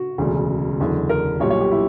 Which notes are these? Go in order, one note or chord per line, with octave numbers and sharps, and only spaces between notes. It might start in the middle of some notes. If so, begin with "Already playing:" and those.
Already playing: F#4
E1 D2 C#3
F#1 E2 D3
A#4
B1 A#2 G3 C#5
C#5
G4
E4